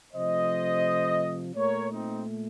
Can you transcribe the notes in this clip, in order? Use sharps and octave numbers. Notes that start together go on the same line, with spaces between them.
C3 F3 A3 C5 D#5
A#2 A3 A#4 C#5
C4 D#4